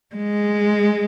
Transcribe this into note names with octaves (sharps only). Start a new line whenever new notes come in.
G#3